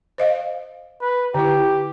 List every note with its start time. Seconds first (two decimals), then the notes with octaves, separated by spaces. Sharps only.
0.18 C5 D#5 F5
1.01 B4
1.34 D3 E4 G4